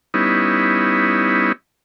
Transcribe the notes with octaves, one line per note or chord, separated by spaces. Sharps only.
G3 B3 C#4 D#4 E4